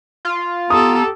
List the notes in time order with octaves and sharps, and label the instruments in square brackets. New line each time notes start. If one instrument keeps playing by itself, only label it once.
[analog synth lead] F4
[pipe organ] B3 A#5 [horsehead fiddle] G4 A4 [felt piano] D#6